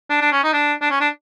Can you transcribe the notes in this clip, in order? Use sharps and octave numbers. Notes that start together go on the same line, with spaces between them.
D4
D4
C#4
D#4
D4
D4
C#4
D4